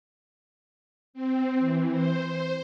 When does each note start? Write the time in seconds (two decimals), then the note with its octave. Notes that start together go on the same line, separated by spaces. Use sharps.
1.14 C4
1.59 E3
1.90 C5
2.29 C5